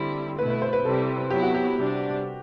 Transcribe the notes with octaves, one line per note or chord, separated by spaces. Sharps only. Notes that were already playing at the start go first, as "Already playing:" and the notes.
Already playing: D3 G3 C4 E4
B2 A3 E4 B4
B4
C5
B4
C3 G3 C4 E4 A4
F#3 B3 E4 G4
F#4
G4
C3 G3 D4